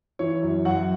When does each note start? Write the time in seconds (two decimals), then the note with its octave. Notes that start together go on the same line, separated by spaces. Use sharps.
0.19 E3 C#5
0.43 F#2
0.65 F#2 F#4 F#5